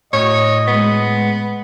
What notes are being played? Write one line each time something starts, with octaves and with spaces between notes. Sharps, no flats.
A2 F#4 C#5 D#5
G#3 B3